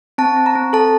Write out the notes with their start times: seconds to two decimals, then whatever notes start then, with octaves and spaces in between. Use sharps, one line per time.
0.18 C4 A5
0.36 C4
0.46 A#5
0.55 C4
0.73 A4 A5